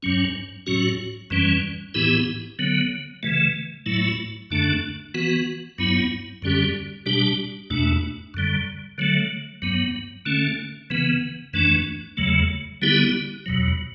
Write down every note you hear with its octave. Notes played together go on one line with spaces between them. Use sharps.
G2 F#3 C#4
A2 F#3 C#4 F#4
F#2 E3 G3 C#4
A2 E3 B3 E4 G4
D3 F#3 B3
C#3 E3 A3
A2 F#3 A3 E4
F#2 D3 A3 D4
E3 B3 F#4
G2 F#3 B3 E4
F#2 D3 G3 C#4 G4
B2 G3 D4 G4
E2 B2 A3 D4
F#2 D3 G3
D3 F#3 A3
G2 F#3 B3
D3 A3 C#4
C#3 E3 B3
F#2 E3 A3 D4
E2 C#3 F#3 A3
D3 G3 B3 E4 G4
E2 B2 F#3